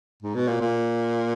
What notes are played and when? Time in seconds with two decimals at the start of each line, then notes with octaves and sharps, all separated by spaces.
0.23 G#2
0.35 B2
0.48 A#2
0.61 A#2